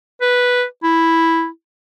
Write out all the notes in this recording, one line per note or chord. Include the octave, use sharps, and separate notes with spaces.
B4
E4